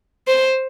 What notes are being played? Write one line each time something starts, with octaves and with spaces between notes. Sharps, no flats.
C5